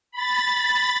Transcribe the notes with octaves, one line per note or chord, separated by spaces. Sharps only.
B5 A6